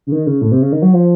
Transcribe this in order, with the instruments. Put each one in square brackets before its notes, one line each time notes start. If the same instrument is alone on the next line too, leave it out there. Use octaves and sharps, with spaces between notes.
[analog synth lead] C#3
D#3
C#3
A2
C3
C#3
D#3
F#3
F3